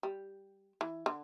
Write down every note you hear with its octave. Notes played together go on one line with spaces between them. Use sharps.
G3
E3
D3